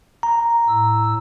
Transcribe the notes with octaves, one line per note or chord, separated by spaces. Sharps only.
A#5
A2 E6